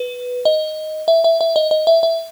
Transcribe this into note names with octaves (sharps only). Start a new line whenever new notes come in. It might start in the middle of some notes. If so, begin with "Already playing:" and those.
Already playing: B4
D#5
E5
E5
E5
D#5
D#5
E5
E5